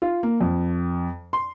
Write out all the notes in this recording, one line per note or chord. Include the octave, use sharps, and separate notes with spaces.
F4
A#3
F2
C6